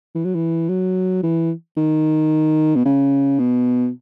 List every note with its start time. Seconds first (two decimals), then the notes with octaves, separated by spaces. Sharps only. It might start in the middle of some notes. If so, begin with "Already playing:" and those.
0.15 E3
0.25 F#3
0.35 E3
0.69 F#3
1.23 E3
1.77 D#3
2.76 B2
2.85 C#3
3.39 B2